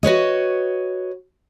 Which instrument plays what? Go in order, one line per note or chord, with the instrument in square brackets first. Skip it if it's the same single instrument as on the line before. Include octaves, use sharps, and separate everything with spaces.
[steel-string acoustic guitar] F#4 B4 C#5 D#5